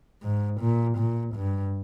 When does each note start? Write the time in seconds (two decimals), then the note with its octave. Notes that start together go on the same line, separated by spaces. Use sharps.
0.23 G#2
0.60 A#2
0.97 A#2
1.35 G2